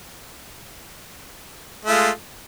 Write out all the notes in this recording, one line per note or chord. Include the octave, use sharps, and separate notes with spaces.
G#3 A3 F4